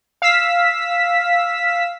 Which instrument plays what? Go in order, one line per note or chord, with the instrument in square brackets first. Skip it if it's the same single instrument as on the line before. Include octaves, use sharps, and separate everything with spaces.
[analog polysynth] F5 E6 B6